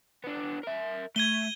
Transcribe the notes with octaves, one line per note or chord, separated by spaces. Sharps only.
B3 D4
A#4 E5
A3 G#6 D#7 G7